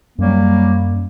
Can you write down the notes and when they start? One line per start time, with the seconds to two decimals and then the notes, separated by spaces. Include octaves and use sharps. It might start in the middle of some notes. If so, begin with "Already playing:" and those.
0.19 F#2 F#3 G3 A#3